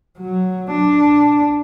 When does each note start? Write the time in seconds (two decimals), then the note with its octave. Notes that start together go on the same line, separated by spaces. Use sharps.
0.18 F#3
0.71 D4